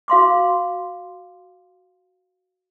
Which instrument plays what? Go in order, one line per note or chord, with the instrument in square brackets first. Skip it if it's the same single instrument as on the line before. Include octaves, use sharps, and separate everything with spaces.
[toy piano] F#4 F5 C6 D6